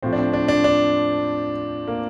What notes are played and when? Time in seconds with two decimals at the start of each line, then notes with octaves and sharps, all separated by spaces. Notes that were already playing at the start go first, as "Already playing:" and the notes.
0.03 A2 F3 C4
0.13 D4
0.18 C4
0.33 D4
0.48 D4
0.64 D4
1.88 A#3